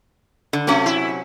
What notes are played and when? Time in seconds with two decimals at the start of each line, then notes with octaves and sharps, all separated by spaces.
0.53 D3
0.67 C3 F#3 A3 C#4
0.86 E4